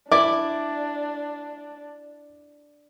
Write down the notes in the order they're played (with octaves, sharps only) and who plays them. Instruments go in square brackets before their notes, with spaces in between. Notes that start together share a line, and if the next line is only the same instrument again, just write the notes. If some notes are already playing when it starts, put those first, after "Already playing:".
[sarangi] D4 [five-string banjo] E4 [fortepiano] D5 D6